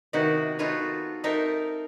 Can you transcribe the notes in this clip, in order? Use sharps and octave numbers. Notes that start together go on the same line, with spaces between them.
C3 D#3 B3 D#4 E4 F#4
D#4 F4 F#4 A4 B4 C#5
C4 D#4 A4 A#4 E5 G5